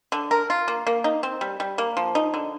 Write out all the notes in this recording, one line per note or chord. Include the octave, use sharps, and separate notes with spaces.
D3
A#4
F4
A#3
A#3
D#4
C4
G3
G3
A#3
F3
D#4
D3